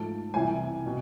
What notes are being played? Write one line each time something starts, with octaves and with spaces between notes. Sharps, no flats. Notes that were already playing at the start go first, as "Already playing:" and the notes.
Already playing: G#2 F3 A3 A5
C2 C3 E3 G#5
B2